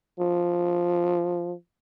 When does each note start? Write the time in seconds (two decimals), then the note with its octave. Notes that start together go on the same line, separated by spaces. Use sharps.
0.20 F3